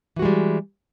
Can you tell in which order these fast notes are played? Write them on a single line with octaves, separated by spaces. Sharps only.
E3 F#4 G#3 G3